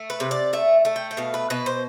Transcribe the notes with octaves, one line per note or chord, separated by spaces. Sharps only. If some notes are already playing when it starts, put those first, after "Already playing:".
Already playing: A3
B4
C3
D5
A3 E5
A3
G5
G5
B2 F5
B4
B2 B4
C5